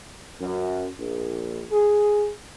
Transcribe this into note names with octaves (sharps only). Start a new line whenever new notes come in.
F#2
A#1
G#4